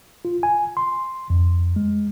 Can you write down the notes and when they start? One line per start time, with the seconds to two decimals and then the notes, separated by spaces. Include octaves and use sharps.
0.25 F4
0.43 G#5
0.77 C6
1.30 F2
1.76 G#3